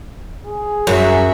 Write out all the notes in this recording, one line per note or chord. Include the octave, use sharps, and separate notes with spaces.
G#4
F#2 F#4 E5